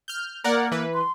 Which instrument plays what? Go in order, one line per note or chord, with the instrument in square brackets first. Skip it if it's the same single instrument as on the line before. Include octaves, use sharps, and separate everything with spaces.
[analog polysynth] F6 G6
[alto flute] A#3 [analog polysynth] A#4 D5 F#5
[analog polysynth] E3 B4
[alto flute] C6